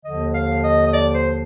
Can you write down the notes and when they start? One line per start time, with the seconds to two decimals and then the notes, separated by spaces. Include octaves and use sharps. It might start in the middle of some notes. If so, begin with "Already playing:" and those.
0.05 D#2 D3 F3 D#5
0.34 F5
0.64 D#5
0.87 D#5
0.93 D5
1.15 C5